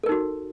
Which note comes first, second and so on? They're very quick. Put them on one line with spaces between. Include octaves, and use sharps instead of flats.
A4 A#4 D#4 F#4